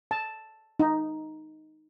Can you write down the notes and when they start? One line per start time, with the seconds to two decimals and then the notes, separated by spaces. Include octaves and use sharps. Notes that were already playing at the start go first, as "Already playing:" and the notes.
0.11 A5
0.80 D#4